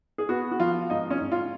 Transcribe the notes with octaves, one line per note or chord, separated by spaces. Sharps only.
G#4
B3 F#4
F#4
F3 F4
G#2 D#4
C#4
G#2
F4